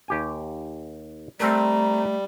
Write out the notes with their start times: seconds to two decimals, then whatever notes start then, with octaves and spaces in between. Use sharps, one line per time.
0.08 D#2 G4 G#5
1.40 G3 A3 C4 A4 A#4 A#5